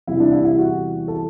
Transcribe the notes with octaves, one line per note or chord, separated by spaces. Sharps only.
E2 C3 E3 G3 E4
D4
E4
E4
F#4
A4